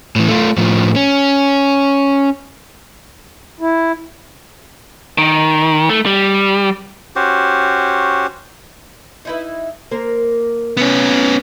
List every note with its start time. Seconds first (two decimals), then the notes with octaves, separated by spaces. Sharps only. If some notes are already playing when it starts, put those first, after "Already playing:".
0.16 A2 E3
0.28 A3 F4
0.57 A2 F3
0.96 C#4
3.60 E4
5.18 D#3
5.89 A3
6.06 G3
7.16 C#4 F#4 G4 C5
9.25 D#4 E4 B4
9.91 A#3 A#4 C5
10.77 C3 B3 C#4